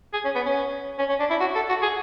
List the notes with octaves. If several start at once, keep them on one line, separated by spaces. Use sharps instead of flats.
G#4
C#4
B3
C#4
C#4
C#4
D4
E4
F#4
A4
F#4
G#4